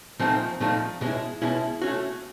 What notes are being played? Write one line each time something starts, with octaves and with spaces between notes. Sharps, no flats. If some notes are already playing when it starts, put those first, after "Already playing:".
A#2 F3 A3 C4 D#4
A#2 F3 A3 C4 D#4
B2 G#3 C#4 E4
B2 G#3 C#4 E4
A3 C#4 F#4